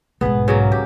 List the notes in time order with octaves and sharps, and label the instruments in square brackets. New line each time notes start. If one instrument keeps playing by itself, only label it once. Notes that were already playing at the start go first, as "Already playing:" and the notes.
[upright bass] B1 G#2 [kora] B3 G#4 B4
[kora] C#3 F#3 A#3
G4